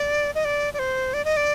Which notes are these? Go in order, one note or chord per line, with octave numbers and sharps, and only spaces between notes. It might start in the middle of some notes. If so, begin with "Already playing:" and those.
Already playing: D5
D#5
D5
D5
C5
D5
D#5
D5